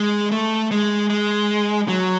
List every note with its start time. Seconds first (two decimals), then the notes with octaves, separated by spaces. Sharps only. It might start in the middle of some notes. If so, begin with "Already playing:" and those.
Already playing: G#3
0.32 A3
0.71 G#3
1.10 G#3
1.88 F#3